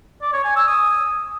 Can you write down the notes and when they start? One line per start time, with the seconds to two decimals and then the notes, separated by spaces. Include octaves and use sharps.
0.22 D5
0.33 C#5
0.44 G#5
0.56 E6
0.67 D#6